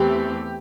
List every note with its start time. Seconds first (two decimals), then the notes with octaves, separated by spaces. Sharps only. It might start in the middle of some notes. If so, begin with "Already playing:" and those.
Already playing: E2 E3 A3 C4 G4